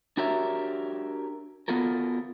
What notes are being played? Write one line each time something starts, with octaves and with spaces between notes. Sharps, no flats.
D4 F#4 G4 A#4 C#5 E5
B3 F4 F#4 A4 A#4